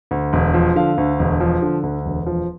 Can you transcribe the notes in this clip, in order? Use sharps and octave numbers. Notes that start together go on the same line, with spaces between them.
D2
E1
F3
D3 F5
D2
E1
F3
D3
D2
E1
F3